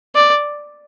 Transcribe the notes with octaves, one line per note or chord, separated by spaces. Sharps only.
D5